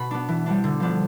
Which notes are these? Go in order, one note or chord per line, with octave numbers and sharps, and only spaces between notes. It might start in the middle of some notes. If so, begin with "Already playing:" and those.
Already playing: B2 B5
B3 D4
E3
G3 B3 D4
D3
F3 B3 D4